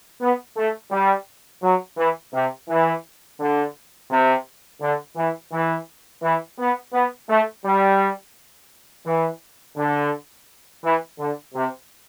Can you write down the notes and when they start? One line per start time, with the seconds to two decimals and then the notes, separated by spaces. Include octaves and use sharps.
0.21 B3
0.56 A3
0.91 G3
1.63 F#3
1.97 E3
2.34 C3
2.69 E3
3.40 D3
4.10 C3
4.81 D3
5.16 E3
5.52 E3
6.23 E3
6.59 B3
6.93 B3
7.29 A3
7.65 G3
9.06 E3
9.77 D3
10.84 E3
11.19 D3
11.54 C3